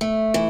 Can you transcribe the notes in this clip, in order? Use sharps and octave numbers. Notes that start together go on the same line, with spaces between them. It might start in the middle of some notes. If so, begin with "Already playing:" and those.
A3
E3